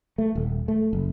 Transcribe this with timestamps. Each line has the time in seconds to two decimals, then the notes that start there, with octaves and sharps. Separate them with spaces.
0.18 A3
0.35 D#1
0.68 A3
0.93 F#1